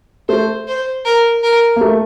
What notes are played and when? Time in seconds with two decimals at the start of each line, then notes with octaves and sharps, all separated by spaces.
0.29 A3 C5
0.67 C5
1.05 A#4
1.43 A#4
1.76 A#3
1.81 A3